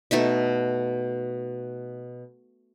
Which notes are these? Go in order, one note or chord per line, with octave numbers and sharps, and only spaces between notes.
B2 A3 D#4 E5